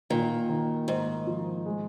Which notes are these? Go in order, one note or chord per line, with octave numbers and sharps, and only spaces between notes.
A#2 D#3
D#3
G#2 A#3
F3
G#3